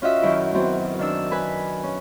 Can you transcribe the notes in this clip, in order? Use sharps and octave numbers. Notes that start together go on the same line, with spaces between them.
C#4 F4 F#4 D#5 E5
F#2 D#3 F#3 E4
F#3 B3 C4
D#3 D4 E6
B4 G#5 B5
C#4